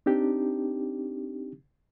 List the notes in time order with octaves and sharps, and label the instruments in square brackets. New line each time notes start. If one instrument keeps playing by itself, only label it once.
[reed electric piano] C4 D4 D#4 G4